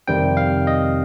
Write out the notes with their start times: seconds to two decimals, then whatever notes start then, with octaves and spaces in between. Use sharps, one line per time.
0.08 F2 C3 D#3 G3 C4 G5
0.37 F5
0.67 D#5